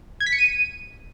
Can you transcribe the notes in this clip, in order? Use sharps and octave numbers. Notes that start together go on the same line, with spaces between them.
G#6
B6
C#7
D#7